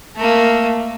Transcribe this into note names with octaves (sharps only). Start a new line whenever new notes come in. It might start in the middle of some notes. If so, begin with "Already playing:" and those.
A3 A#3